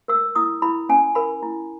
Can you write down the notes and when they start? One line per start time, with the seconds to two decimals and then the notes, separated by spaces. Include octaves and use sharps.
0.08 A#4 E6
0.35 E4 D#6
0.62 E4 B5
0.89 C#4 G#5
1.15 A#4 B5
1.43 E4